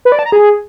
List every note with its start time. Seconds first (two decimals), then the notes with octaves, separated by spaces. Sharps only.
0.05 B4
0.12 D5
0.19 A5
0.26 A#5
0.32 G#4